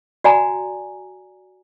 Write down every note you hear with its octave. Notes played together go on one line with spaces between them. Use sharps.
F#4 D5 G#5 A#5